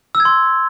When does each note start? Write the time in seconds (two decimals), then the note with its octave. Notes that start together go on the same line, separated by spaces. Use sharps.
0.15 E6
0.20 G#6
0.25 C6